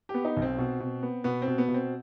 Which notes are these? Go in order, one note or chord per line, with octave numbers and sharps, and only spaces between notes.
G4
B3
D#4
B1
C4
B2
B2
B3
B2 B3
C4
B2
B3
B2
C4